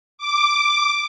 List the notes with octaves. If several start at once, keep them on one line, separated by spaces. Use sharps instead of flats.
D6